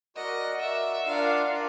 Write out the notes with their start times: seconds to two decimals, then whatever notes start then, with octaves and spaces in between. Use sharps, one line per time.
0.16 F#4 A#4 D5 D#5 F#5
0.61 F#4 A#4 D5 E5 F#5
1.06 D4 F4 A#4 D5 F5 F#5
1.51 D4 F4 A#4 D5 F#5